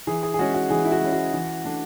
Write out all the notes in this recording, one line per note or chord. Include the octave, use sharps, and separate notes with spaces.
E3 G#4
G#4
G#4
G#3 C#4 F#4
F#4
E3 G#4
E4
F#4
G#3 C#4
F#4
E3
A3 D4